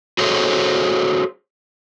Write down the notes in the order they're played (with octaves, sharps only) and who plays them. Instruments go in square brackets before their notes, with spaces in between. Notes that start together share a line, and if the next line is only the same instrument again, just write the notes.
[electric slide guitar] F#4 G#4 A4 C5 C#5